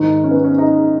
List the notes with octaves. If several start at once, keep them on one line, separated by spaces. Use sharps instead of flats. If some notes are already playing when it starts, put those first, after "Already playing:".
Already playing: G#2 D#3 D#4
C#4
B3
C#4
D#4